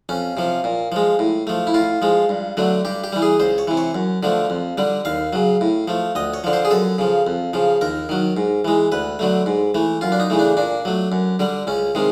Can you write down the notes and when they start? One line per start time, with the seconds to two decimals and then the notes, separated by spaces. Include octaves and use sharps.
0.09 F2 C#4
0.37 C3 F3
0.64 A#2
0.92 F3 G#3
1.19 A2
1.47 F3 A3
1.67 E4
1.74 A2 F4
2.02 F3 G#3
2.29 G2
2.57 D3 F#3 A3
2.85 G2 G4
3.04 G4
3.12 E3 G3
3.22 G#4
3.40 C#2 C5
3.58 C#5
3.67 C3 E3
3.77 C#5
3.95 F#2
4.23 D3 F3 A3
4.50 F2
4.78 D3 G3
5.05 D#2 F5
5.33 C#3 F#3
5.61 A2
5.88 F3 A3
6.15 D2 D#5
6.34 C#5
6.44 D3 F3
6.53 C5
6.65 G#4
6.71 F#2 A4
6.98 C#3 F3
7.27 F2
7.53 C#3 F3
7.81 D#2 A#4
8.09 D#3 F#3
8.37 G#2
8.65 E3 G#3
8.92 D2 B4
9.19 D3 F#3 A3
9.46 G#2
9.75 E3 A3
10.01 F#2 F4
10.12 D4
10.20 D#4
10.30 C#3 E3 A3
10.39 D4
10.57 A#2 D4
10.85 F#3 A3
11.12 F#2
11.39 D3 G3
11.67 C#2 C#4
11.95 C3 D#3 G#3